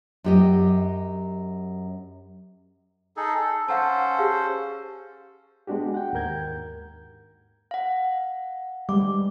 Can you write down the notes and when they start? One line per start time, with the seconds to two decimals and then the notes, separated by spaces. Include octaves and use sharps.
0.24 F#2 G4 D#5
3.17 D#4 G#4 A4
3.35 A4
3.68 C#4 A4 C5 F5 F#5 A5
4.19 G4 G#4 F5
5.67 G#3 B3 D4 F#4 G4
5.94 F#5 G5
6.13 D#2 G#2 A#4 G6 G#6
7.71 F5 F#5
8.89 G3 G#3 D6